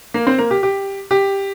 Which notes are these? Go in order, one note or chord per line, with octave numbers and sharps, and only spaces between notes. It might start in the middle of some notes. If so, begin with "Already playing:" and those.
A#3 A#4
C4 C5
A#3 A#4
G4
G4
G4